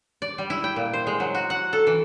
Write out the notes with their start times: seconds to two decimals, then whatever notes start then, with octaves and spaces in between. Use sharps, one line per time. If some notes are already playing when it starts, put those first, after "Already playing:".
0.22 D5
0.38 G3
0.50 E4
0.64 G5
0.76 A#2
0.93 C5
1.07 G#3
1.20 F#3
1.35 F#4
1.50 F#5
1.73 A4
1.87 E3